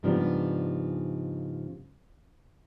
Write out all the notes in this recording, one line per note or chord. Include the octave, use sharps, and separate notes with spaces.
G#2 C#3 F3 G3 B3 D4